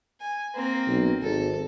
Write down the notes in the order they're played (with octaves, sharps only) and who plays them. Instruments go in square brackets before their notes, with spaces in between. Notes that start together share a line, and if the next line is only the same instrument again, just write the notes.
[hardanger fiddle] G#5
A#3 C4
[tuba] B1
[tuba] G#1 [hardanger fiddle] A4